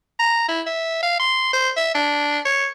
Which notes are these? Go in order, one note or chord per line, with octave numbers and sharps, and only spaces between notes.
A#5
E4
E5
F5
C6
C5
E5
D4
C#5